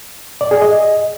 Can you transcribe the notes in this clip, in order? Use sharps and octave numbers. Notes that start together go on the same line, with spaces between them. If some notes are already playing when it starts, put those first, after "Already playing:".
D5
G#4
D#5